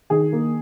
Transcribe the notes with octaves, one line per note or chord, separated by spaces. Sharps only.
D#3 G#4
A#3